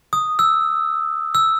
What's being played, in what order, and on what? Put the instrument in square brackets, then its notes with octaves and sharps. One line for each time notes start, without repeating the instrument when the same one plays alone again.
[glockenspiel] D#6
E6
E6